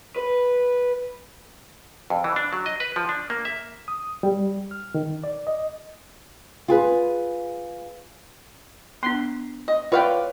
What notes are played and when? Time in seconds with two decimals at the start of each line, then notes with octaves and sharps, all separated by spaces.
0.16 B4
2.10 F2
2.24 E3
2.36 D4
2.53 F#3
2.66 D#5
2.80 B4
2.96 F3
3.09 D4
3.30 A#3
3.45 E5
3.88 D#6
4.23 G3
4.71 F6
4.94 D#3
5.24 D5
5.47 D#5
6.68 F4 G#4 B4
9.03 B3 D4 C6
9.68 D#5
9.92 F4 B4 C#5 D5 F5 G5